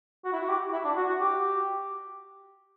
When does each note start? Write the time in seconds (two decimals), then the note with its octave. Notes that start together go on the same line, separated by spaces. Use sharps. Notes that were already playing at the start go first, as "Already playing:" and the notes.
0.25 F#4
0.33 E4
0.40 F#4
0.48 G4
0.73 E4
0.84 D4
0.97 F#4
1.09 F#4
1.21 G4